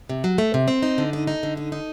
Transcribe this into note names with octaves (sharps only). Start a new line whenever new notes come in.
C3
F#3
A3
C3
C4
D#4
D3
D#4
D#4
D3
D#4
D#4